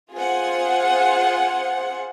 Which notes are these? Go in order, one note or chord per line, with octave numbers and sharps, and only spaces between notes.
F4 G#4 C5 F#5